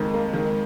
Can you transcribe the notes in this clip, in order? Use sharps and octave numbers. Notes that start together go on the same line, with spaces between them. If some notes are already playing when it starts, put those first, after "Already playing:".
Already playing: F2 D#3 G#3
A#3
D#3